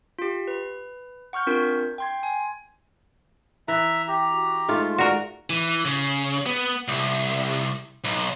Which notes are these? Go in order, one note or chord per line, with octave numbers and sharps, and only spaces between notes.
F4 G4
B4
F#5 C#6 F6 G6
C4 D4 F4 A#4 G6
G5 C6 G#6
G#5
E3 E5 A#5
G4 G5 A#5
F#4
G#2 A3 F4 C6
F#4 A#4 D5
E3
C#3
B3
C2
B1